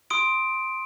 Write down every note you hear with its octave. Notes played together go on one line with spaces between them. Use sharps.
C6 D#6 D7